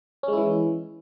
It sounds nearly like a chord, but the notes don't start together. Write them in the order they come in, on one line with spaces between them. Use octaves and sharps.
C#4 G#3 E4 E3